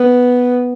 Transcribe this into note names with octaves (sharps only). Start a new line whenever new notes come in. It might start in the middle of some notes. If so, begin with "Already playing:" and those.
Already playing: B3